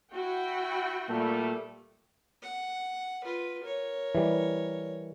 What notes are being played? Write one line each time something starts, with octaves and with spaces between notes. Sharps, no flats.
E4 F#4 G5
A#2 G3 A3
F#5
F4 B4
A#4 C#5
E3 G3